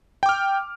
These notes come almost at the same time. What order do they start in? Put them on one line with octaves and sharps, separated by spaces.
G5 D6 F6